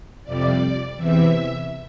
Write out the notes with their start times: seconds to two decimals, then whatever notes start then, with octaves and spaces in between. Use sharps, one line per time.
0.24 F2 C3 G3 D5
0.96 E2 C3 E3 E5